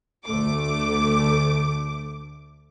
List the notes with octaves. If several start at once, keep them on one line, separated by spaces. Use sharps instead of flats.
D2 A3 D6